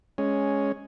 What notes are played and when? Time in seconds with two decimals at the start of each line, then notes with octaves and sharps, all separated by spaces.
0.18 G#3 C#4